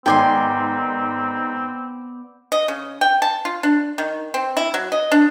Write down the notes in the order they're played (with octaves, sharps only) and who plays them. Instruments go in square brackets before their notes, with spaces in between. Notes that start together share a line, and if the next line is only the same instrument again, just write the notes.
[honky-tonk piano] G#2 D#3 [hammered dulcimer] B3 D5 [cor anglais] C4 [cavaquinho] G5 G#5 C6
[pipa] D#5
C#3
G5
A5
F4
D4
D#3
C4
E4
F#3
D#5
D4